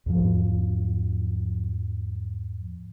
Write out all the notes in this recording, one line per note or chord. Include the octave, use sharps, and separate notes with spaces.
E2 G#2 F3